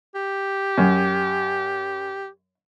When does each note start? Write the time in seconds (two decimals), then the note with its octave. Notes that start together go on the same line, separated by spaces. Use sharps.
0.15 G4
0.78 F#2